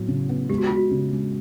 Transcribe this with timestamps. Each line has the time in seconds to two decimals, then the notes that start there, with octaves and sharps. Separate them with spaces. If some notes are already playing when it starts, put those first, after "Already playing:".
Already playing: A2 F#3 B3
0.08 C#3
0.29 B3
0.49 G#3 G4
0.58 F#4
0.67 G#3 F4
0.76 F#4
0.91 C#3
1.13 G#3